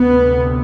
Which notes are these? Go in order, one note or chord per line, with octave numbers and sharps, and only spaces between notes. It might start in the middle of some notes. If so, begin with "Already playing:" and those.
Already playing: D2 C3 B3